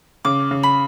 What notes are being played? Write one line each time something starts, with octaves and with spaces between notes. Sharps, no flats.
C#3 D6
C#3
B5